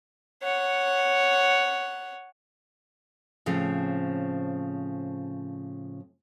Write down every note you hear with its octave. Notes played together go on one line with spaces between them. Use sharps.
C#5 F#5
A2 C#3 F3 C4